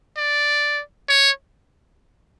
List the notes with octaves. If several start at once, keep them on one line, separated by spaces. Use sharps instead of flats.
D5
C#5